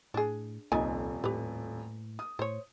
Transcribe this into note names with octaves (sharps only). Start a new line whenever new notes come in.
A2 D4 G#4
D#1 C2 F2 D#4 D5 G#5
A2 G4 B4
D#6
A2 C5 C#5